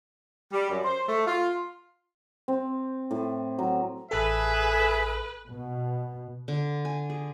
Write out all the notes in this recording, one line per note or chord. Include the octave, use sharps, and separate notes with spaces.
G3
F#2
C5
A3
F4
C4
A2
F#3
A1 G#4 A4 B4 E5
B2
D3
G#5
G#4